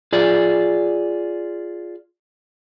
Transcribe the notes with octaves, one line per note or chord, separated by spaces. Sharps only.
F4 G#4 D5